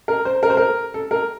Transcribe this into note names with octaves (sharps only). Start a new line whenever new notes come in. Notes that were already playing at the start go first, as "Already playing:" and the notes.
A#4
C5
A#4
C5
A#4
A4
A#4